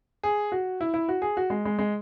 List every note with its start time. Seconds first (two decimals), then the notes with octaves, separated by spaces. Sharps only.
0.23 G#4
0.52 F#4
0.81 E4
0.94 E4
1.09 F#4
1.22 G#4
1.37 F#4
1.50 G#3
1.65 G#3
1.79 G#3